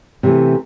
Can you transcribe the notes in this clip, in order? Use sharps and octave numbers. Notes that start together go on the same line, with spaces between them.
C3 E3 A3